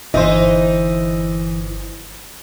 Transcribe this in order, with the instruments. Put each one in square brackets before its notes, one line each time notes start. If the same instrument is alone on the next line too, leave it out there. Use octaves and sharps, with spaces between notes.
[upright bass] G1 [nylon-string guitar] E3 D#5 [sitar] D#4 C5